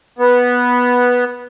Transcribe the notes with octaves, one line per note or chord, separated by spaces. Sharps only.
B3